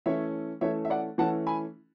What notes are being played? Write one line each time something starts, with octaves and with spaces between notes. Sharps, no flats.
E3 A3 C#4 C#5 E5
E3 A3 C#4 C#5 E5
E5
D5 F#5
E3 A3 C#4 F#5 A5
G#5 B5